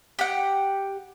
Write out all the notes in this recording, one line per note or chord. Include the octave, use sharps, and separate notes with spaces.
G4 F#5